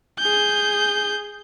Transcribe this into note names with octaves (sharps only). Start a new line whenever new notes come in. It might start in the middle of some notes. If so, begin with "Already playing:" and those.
G#4 G6